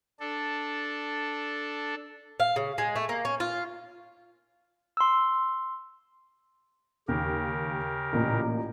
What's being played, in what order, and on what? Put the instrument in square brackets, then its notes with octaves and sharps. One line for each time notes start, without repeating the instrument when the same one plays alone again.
[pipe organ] D4 A4
[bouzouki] F5
C#3
G#3
A3
A#3
C#4
F4
[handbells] C6 E6
[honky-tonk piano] D#2 [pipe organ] C#3 G4 A#4
[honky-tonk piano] A1 A#2 A#5